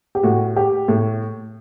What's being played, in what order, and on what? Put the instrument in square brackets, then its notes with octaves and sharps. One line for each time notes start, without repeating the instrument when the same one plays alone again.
[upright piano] G4
A2 F#4
G4
A2